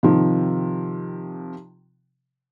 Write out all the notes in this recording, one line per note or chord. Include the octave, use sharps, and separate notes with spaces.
C3 D#3 F3